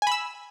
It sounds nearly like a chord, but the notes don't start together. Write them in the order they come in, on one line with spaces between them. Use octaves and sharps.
G#5 B5 E6